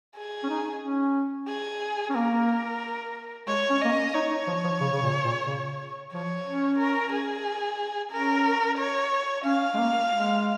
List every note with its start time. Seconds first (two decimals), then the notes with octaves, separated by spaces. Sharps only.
0.16 G#4
0.43 C#4
0.49 D#4
0.82 C#4
1.48 G#4
2.09 C#4
2.14 A#3 A#4
3.48 G#3 C#5
3.70 C#4
3.81 A#3 D#5
3.92 C#4
4.14 D#4 C#5
4.31 D#4
4.47 F3
4.64 F3
4.80 C#3
4.92 C#3
5.02 A#2
5.25 A#2
5.46 C#3
6.13 F3 C#5
6.46 C#4
6.79 A#4
7.12 G#4
8.12 C#4 A#4
8.78 C#5
9.45 C#4 F5
9.74 G#3
9.78 A#3
10.11 G#3